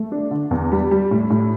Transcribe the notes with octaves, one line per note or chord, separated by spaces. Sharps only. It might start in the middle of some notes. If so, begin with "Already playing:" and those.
Already playing: A3
D4
D3
E2
G3
G3
A2
A2